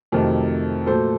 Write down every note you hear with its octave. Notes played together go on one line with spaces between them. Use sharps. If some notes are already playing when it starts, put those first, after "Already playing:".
F2 C3 D#3 F#3 A3 A#4
A#2 F#3 A3 A4 C5